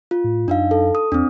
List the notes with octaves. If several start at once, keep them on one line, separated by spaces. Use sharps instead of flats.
F4
A2
F#2 D4 D#4 F5
A4
D#6
E2 C4 D4